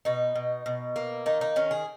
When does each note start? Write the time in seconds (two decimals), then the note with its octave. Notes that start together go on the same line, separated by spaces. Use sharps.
0.05 B2 D#4
0.35 B2
0.66 B2
0.96 A#3
1.26 D#3 D#4
1.41 D#4
1.56 D#3 C#4
1.71 G#4